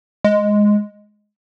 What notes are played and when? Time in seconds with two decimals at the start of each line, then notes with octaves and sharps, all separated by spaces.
0.25 G#3